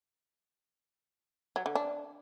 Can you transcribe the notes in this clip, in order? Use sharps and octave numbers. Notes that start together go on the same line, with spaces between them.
F#3
D3
D4